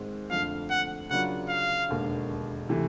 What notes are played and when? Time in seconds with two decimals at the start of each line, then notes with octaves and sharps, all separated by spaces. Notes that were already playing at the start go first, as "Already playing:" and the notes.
Already playing: G#2 D#3 G#3 C4
0.31 F2 D3 F3 A3 F5
0.70 F#5
1.10 C#3 F#3 A#3 D4 F4 F#5
1.49 F5
1.89 E1 D#2 D3
2.69 C3 E3 A3